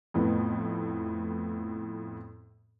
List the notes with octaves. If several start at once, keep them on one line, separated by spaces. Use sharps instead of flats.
F2 A2 B3